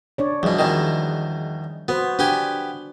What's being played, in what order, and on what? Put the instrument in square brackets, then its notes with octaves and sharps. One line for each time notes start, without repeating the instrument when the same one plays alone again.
[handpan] D4 C#5 D5
[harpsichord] E2 B2 [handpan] F3 G3 G#4
[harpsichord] E2 B2 D#3
[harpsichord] B3 [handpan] F#4 B4 C5
[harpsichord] B3 G4 G#5 [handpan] D4